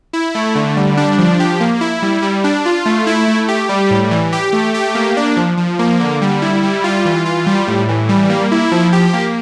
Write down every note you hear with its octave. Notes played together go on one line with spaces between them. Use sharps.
E4
A3
D3
G3
D4
F3
G4
A#3
E4
G3
G3
D4
F4
A3
E4
A3
G4
G3
A2
E3
G4
A3
G4
A#3
D4
F3
F3
A#3
D3
G3
E4
G3
F4
E3
F4
G3
A2
E3
G3
A#3
E4
F3
G4
A#3